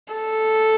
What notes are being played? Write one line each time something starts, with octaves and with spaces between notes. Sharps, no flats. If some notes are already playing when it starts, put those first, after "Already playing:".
A4